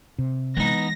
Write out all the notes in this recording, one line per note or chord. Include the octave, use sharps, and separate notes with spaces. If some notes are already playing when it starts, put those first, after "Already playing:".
C3
E3 G#3 B3 D#4 A#6